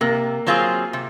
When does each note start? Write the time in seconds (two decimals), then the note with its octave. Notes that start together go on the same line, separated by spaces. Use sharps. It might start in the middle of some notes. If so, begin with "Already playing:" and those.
0.01 C3 A#3
0.47 F#3 C4 F4 G#4
0.93 C3